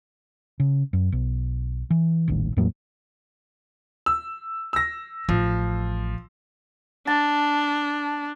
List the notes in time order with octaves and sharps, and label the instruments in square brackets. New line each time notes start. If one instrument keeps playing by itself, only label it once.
[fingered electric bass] C#3
F#2
B1
E3
D#1 A1 D#2
E2 A2 F#3 A#3
[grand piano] E6
E6 A#6
[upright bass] A1 [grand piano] F3
[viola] D4 [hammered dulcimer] A5